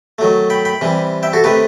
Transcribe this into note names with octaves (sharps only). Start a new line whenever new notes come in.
D#3 F#3 A3
G5 B5
G5 B5
C3 E3 G3
E5 G5
F#4 A4
C3 D#3 A3 G4 B4